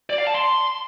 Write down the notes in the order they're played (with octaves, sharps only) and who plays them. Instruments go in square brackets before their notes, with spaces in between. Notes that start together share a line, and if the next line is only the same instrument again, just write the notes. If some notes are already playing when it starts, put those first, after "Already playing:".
[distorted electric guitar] D5
F5
A5
C6